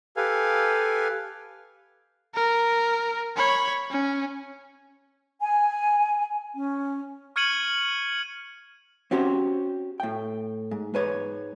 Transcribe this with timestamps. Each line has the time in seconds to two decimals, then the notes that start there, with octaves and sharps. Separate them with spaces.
0.16 G4 A4 B4 F5 G#5
2.35 A#4
3.37 C#5 B5
3.91 C#4
5.41 G#5
6.55 C#4
7.36 C#6 F6 G#6 C#7 D#7 F#7
9.11 C4 C#4 F#4 G4 C5
10.00 A2 G5
10.71 G#2
10.94 G#2 B4 C#5